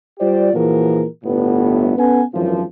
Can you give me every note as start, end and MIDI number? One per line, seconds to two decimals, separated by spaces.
0.19 0.51 55
0.19 0.51 65
0.19 0.51 67
0.19 0.51 72
0.19 0.51 74
0.53 1.04 46
0.53 1.04 52
0.53 1.04 53
0.53 1.04 66
0.53 1.04 68
0.53 1.04 70
1.24 1.93 31
1.24 1.93 45
1.24 1.93 59
1.97 2.22 59
1.97 2.22 61
1.97 2.22 69
1.97 2.22 71
1.97 2.22 78
1.97 2.22 80
2.33 2.62 32
2.33 2.62 42
2.33 2.62 49
2.33 2.62 52
2.33 2.62 53